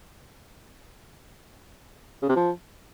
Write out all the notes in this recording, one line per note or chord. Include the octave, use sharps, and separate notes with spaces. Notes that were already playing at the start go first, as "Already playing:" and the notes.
C#3
C3
F3